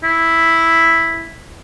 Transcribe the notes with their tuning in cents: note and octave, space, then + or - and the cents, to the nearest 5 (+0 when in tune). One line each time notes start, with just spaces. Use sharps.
E4 +0